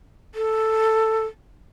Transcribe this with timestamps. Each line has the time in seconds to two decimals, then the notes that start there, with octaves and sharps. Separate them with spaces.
0.35 A4